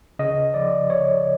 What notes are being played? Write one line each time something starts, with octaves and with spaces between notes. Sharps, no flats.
C#3 D#5
F3 D5
C#3 C#5